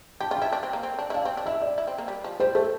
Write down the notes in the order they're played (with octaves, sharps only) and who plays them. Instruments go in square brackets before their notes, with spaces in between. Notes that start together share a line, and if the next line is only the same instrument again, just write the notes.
[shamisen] G4 [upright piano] A5
[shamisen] F4
[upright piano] G5
[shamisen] E4
D4
C4
A#3
C4
D4
E4
[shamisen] D4 [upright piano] F5
[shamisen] C4
D4
[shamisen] E4 [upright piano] E5
[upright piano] D5
[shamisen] E4
C4
A#3
G3
F3
[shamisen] G3 [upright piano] C5
[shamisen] A3 [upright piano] A4